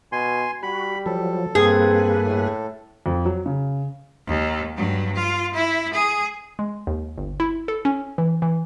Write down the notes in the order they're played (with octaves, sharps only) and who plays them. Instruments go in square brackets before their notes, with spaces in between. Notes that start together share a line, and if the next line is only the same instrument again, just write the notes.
[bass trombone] B2 [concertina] G#5 C6
[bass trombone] G3 [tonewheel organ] F#4 [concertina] B5
[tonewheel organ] F3 F#3 [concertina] A4
[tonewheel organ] G2 A#3 B4 [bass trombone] C4 [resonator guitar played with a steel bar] G#4
[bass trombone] A2
[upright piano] F2
F#3
C#3
[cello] D#2
G2 F#3
F4
E4
G#4
[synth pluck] G#3
D#2
G1
E4
A4
C#4
E3
E3